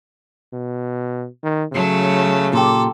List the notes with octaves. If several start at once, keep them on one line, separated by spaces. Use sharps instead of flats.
B2
D#3
C#3 F#3 A3
A#2 G4 A4